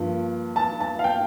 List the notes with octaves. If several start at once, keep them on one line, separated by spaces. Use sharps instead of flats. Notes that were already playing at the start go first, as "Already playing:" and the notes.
Already playing: G2 F3 A#3
A5
A5
F5
G5